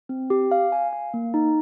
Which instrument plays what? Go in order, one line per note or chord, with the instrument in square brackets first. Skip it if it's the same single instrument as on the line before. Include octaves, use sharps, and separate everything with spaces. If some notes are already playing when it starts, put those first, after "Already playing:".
[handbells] C4
G4
F5
G#5
F5
A#3
D#4